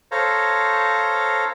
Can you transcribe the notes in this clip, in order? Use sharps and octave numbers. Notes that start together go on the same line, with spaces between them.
A4 C5 C#5 F5 A#5